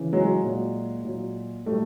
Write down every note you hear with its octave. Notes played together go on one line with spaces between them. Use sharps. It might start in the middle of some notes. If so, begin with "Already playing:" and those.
Already playing: C#3 E3
F#3 G#3
A#2 F#3
A#2 F#3
A#2 F#3 G3 A3